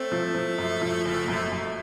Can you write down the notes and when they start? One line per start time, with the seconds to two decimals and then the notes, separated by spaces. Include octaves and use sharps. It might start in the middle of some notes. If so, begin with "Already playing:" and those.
Already playing: A3 C4
0.12 F3
0.35 F3
0.58 F#2
0.82 F3
1.05 F#1
1.28 F#2
1.51 F#2